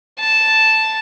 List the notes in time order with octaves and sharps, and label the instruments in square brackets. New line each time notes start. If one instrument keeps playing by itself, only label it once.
[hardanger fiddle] A5